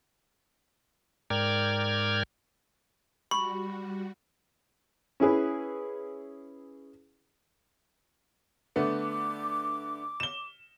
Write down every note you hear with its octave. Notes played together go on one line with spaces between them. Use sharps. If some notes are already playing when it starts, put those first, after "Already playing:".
G#2 A#4 D5 G5 F6 G#6
G3 F#4 B5 C#6
C#4 E4 G#4 B4
D3 A3 B3 D6
E7 G7